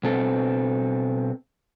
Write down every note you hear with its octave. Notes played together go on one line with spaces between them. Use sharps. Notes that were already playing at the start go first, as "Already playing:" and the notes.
B2 C4 A4